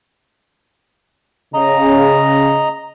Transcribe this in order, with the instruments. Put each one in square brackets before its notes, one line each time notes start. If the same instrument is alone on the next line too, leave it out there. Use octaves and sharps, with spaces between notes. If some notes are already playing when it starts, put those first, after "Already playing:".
[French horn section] C#3 [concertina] D#5 A#5